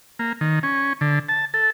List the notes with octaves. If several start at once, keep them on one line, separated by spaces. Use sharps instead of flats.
A#3
D#3
C#4
D3
A5
A4